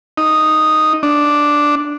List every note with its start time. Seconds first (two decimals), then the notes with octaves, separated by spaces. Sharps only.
0.18 D#4
1.03 D4